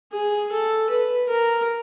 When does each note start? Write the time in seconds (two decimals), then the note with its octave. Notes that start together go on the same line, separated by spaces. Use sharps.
0.13 G#4
0.52 A4
0.90 B4
1.29 A#4